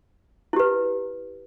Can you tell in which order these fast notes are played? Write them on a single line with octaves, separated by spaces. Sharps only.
E4 G4 B4